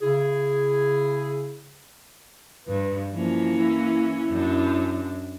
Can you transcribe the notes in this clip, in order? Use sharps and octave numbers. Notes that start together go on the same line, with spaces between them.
C#3 E4 G#4
G2 B4
E3 F3 A#3 C#4
E4
F#2 D4